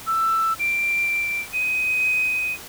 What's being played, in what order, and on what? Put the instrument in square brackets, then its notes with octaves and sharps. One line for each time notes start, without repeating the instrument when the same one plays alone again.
[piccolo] E6
D7
D#7